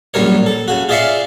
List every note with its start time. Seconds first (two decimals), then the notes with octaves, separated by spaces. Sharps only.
0.14 A#1 F#2 G3 A#4 C#5
0.46 A4
0.68 C#3 F#4
0.89 F4 G#4 D5 E5 F5 C#6